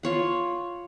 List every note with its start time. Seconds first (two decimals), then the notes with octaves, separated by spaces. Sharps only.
0.03 F4 C#5 F#5